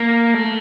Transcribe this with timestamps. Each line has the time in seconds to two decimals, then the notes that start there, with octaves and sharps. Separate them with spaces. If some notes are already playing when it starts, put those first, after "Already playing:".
Already playing: A#3
0.34 A3